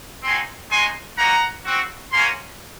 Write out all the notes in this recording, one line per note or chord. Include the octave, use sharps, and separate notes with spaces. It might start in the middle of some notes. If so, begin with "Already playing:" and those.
C4 D#4 F#4 G#5 C6
G#3 D#4 F#4 G#5 C6
A#3 D#4 F#4 F#5 A#5
C4 F#4
A#3 C#4 F#4 G#5 C6